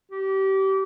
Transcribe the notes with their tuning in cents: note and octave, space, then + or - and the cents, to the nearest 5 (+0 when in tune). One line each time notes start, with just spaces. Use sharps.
G4 -30